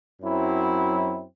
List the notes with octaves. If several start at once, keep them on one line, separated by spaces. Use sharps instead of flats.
F#2 F#3 C4 E4